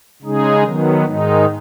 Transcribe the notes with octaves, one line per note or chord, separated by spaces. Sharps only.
C#3 G#3 D#4 G#4
D#3 F#3 B3
G#2 D#3 G#3 D#4